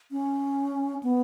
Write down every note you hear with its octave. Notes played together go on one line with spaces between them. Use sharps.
C#4
B3